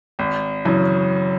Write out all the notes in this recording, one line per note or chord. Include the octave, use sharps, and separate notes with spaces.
G#1
F#2 C#3 E3